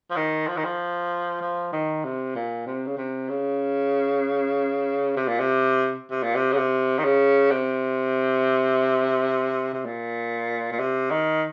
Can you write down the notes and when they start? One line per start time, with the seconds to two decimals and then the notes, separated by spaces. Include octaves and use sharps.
0.11 F3
0.16 D#3
0.48 F3
0.57 D#3
0.64 F3
1.41 F3
1.72 D#3
2.04 C3
2.35 A#2
2.66 C3
2.86 C#3
2.97 C3
3.29 C#3
5.16 C3
5.28 A#2
5.39 C3
6.11 C3
6.23 A#2
6.36 C3
6.52 C#3
6.57 C3
6.99 D#3
7.04 C#3
7.51 C3
9.73 C3
9.85 A#2
10.72 A#2
10.80 C3
11.11 D#3